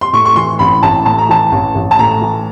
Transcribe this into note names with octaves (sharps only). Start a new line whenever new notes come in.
C6
A2 C#6
C#6
E3 C6
A1 B5
A1 A5
A2 A5
A#5
E3 A5
A1
A1
A5
A2 A#5
E3